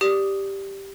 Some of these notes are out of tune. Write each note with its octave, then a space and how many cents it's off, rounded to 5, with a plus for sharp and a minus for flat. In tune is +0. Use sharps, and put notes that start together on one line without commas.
G4 +0 D5 +0 D#6 +0